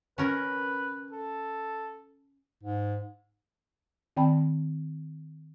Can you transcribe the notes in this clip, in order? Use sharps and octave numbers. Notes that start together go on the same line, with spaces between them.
C#4 A#4 B4
A4
G#2
D#3 C4 D5 G5 A5 B5